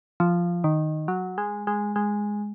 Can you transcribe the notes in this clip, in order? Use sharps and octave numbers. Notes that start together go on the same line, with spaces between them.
F3
D#3
F#3
G#3
G#3
G#3